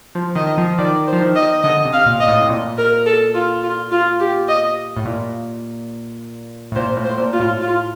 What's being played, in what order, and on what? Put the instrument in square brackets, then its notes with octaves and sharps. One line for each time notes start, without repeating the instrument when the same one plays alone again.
[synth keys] F3
[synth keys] D#3 [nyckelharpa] D#5
[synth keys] F3
[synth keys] D#3 [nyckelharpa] D5
[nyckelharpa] C5
[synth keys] F3
D#3
[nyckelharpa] D#5
[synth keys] D3 [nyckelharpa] D#5
[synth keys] C3
[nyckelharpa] F5
[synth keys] A#2
[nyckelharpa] D#5
[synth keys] A2
C3
A#2
[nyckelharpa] A#4
A4
F4
F4
F4
G4
D#5
[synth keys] A2
A#2
A2
[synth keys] A#2 [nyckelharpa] C5
[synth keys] A2
[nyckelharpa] C5
[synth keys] A2
A#2
[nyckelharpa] F4
[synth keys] A2
[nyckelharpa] F4